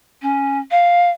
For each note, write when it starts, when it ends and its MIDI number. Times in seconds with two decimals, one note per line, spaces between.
0.22 0.59 61
0.71 1.10 77